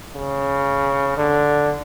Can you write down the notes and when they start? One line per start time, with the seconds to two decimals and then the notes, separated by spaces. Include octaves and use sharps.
0.15 C#3
1.17 D3